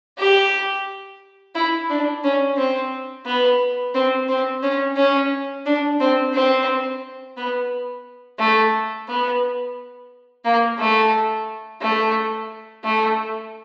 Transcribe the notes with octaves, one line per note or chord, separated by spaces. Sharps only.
G4
E4
D4
C#4
C4
B3
C4
C4
C#4
C#4
D4
C4
C4
B3
A3
B3
A#3
A3
A3
A3